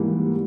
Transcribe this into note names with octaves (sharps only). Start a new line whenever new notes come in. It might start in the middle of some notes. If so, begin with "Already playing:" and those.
Already playing: G#2 E3 G3 A#3